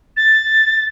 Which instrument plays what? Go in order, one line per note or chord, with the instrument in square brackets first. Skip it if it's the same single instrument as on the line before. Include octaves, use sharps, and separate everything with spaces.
[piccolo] A6